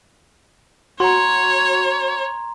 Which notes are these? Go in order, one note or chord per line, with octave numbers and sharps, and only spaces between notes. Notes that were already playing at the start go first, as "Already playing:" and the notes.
F#4 C#5 A#5 C6